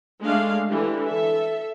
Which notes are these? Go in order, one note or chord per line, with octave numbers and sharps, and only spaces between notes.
G#3 A3 D4 F5
D3 E3 G4
A4 E5